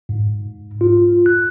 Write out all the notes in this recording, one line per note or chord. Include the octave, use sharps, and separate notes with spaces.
G#2
F4
F#6